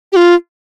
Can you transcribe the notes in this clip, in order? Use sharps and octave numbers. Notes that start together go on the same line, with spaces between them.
G4
F4